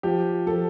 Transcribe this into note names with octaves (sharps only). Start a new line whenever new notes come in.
F3 G4
F3 A4